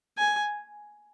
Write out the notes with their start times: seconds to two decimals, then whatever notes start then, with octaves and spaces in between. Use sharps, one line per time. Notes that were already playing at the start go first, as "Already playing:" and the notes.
0.18 G#5